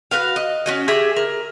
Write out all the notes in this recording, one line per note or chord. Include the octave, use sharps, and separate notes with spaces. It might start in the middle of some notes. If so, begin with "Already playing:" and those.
F#4 A#4 B4 F5
D#5
C#4 F#4 D#5
G4 G#4 E5
A#4